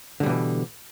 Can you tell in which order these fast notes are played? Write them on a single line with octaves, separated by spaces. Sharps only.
D3 G3 B2 E3